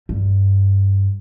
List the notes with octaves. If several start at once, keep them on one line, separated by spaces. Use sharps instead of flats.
G2